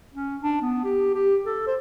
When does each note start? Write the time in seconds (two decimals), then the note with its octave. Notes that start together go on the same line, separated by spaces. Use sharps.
0.14 C#4
0.42 D4
0.62 B3
0.84 G4
1.15 G4
1.46 A4
1.67 C5